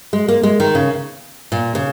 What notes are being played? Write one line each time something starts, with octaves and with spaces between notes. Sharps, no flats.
G#3
A#3
G#3
D#3
C#3
A#2
C#3